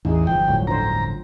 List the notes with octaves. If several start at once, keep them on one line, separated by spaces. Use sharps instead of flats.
A1 E2 D#4 G#4
G1 F3 G5
D2 A2 F#3
D3 C5 A#5